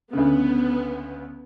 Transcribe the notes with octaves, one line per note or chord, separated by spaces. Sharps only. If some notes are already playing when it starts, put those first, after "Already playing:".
D2 C#3 B3